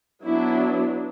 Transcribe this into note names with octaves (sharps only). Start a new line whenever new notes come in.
F#3 B3 D4 E4